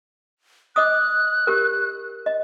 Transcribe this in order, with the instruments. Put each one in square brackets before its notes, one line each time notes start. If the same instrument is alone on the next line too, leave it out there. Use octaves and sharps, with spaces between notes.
[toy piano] D#5 D6 D#6 [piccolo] F#6
[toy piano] G4 A#4
D#5